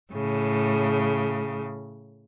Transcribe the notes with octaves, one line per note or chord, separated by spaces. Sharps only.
A2 C#3